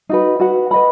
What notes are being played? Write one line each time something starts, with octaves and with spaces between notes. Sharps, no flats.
D#4 F#4 B4
F#4 B4 F#5
B4 D#5 F#5 B5